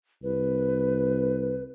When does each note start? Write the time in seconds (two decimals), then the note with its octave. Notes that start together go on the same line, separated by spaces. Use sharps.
0.23 C2 B4